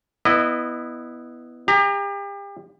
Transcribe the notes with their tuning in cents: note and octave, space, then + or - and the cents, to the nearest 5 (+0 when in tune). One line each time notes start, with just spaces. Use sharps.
B3 +0 E4 +0 D#5 -30
G4 +35 A#5 +0